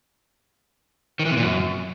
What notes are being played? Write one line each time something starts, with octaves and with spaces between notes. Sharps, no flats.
D#3
E3
C3
A#2
F#2